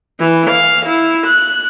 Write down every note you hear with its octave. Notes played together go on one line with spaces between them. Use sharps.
E3
F5
E4
F#6